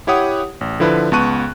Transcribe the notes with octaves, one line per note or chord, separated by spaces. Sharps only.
E4 G4 C#5 F#5 D#6
A1
D3 F3 E4 B4
C#2 B3 A5 C#6 F#6 D#7